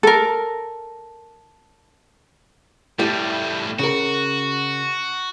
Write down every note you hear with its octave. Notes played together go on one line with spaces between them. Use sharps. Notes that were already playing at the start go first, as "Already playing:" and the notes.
A4 A#4
A2 G3 A3 E4 G4
C#3 F#4 A#4